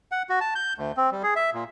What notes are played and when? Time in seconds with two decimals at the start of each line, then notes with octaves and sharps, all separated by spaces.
0.12 F#5
0.29 F#4
0.41 A5
0.55 G6
0.78 D2
0.97 C4
1.12 G3
1.23 G#4
1.36 E5
1.54 A#2